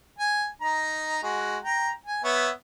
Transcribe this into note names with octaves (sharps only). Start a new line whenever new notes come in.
G#5
D#4 A#5
G#3 F#4
G5 A#5
G#5
B3 C#5 E5